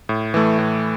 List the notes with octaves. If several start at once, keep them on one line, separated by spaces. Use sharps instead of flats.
A2
E3 A3
A2